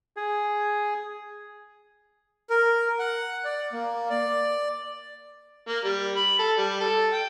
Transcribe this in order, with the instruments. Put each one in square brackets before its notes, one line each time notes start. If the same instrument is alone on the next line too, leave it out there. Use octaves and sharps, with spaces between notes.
[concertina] G#4
[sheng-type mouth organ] A#4
F#5
D5
A#3
D5
[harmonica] A#3
G3
B5
A4
G3
A4
G5